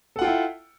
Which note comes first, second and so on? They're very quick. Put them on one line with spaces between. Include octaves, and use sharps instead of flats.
A4 F#5 F4 G5 E4